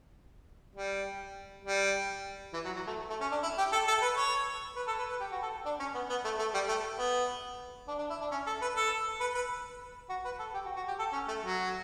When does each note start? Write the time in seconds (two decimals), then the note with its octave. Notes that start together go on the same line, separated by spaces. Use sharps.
0.76 G3
1.65 G3
2.53 E3
2.65 F#3
2.76 F#3
2.87 A3
3.10 A3
3.21 C#4
3.31 D4
3.43 E4
3.58 G4
3.72 A4
3.88 A4
4.02 B4
4.17 C#5
4.76 B4
4.87 A4
4.99 B4
5.10 B4
5.20 G4
5.32 F#4
5.42 A4
5.65 D4
5.79 C#4
5.94 B3
6.09 B3
6.24 A3
6.39 A3
6.54 G3
6.68 A3
6.98 B3
7.88 D4
7.98 D4
8.10 E4
8.21 D4
8.31 C#4
8.47 A4
8.62 B4
8.76 A4
9.20 B4
9.35 B4
10.09 F#4
10.25 B4
10.39 A4
10.54 G4
10.65 F#4
10.76 F#4
10.88 G4
10.99 A4
11.12 C#4
11.28 A3
11.43 F#3